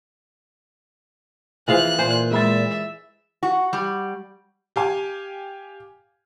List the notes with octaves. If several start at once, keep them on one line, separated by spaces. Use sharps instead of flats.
E3 F3 F4 G#4 C5 F5 F#6
A#2 C5 G#5 C6
G#3 E5 B5 A6
F#4
G3
G4 F5 G#5